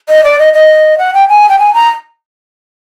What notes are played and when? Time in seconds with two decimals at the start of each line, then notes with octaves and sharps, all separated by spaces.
0.09 D#5
0.24 D5
0.39 D#5
0.54 D#5
0.98 F#5
1.14 G5
1.28 G#5
1.49 G5
1.59 G#5
1.74 A#5